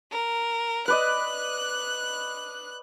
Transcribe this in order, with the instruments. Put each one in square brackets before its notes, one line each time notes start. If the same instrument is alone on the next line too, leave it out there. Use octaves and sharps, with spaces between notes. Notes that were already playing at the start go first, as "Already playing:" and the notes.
[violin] A#4
[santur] B4 D5 D#5 [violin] F#6